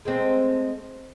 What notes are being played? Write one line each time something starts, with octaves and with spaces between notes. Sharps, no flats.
G#3 A3 C4